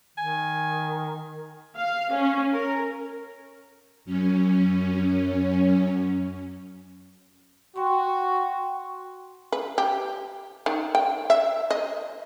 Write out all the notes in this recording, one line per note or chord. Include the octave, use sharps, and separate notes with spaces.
D#3 G#5
F5
C#4
A#4
F#2 C#4
F#4 G5 C6 C#6
B4
G4
D#3
G5
E5
D#5